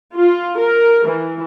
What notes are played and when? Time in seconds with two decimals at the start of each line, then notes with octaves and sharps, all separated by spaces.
0.16 F4
0.59 A#4
1.08 E3